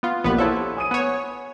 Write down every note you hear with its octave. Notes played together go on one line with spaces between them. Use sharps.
B3 F4
A#1 A#3 B3 G4 B4
E4 A4 C5 C#5 E5
G#5 D#6 D#7
B3 C#5